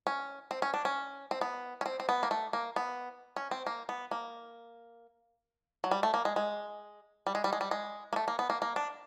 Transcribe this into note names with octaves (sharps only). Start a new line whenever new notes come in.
C#4
C4
C#4
D4
C#4
C4
B3
C#4
C4
C4
B3
A#3
A3
A#3
B3
C#4
C4
A#3
B3
A#3
F#3
G3
A3
A#3
G#3
G#3
G3
G#3
G3
G#3
G3
G#3
A#3
A3
A#3
B3
A#3
A#3
D4